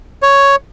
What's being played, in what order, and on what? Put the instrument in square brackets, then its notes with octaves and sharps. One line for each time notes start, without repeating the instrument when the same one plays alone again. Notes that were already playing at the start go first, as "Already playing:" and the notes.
[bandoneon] C#5